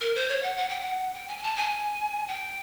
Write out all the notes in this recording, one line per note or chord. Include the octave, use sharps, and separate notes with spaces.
A#4
C5
C#5
F#5
F#5
G5
F#5
G5
G#5
G#5
A5
G#5
G5